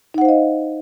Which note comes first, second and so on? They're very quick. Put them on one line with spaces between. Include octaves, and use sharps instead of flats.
D#4 F#5 C5 F5 D#5